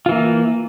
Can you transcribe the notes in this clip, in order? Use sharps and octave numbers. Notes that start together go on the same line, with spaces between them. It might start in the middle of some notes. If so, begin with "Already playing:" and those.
E3 A#3 F4